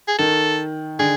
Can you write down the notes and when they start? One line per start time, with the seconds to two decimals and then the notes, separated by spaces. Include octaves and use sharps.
0.08 G#4
0.19 D#3 A4
0.99 D3 G#4